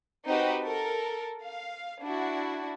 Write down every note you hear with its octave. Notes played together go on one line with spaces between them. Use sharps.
C4 D#4 F#4 G4 B4
A4 A#4
F5
D4 E4 F#4